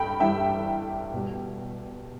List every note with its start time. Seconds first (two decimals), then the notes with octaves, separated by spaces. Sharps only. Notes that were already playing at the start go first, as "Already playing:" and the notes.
Already playing: G2 G5 B5
0.20 G2 E3 G3 E5 G5
1.13 B2 G3